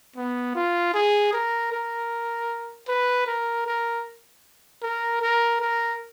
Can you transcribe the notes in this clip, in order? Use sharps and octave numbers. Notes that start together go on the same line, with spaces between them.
B3
F4
G#4
A#4
A#4
B4
A#4
A#4
A#4
A#4
A#4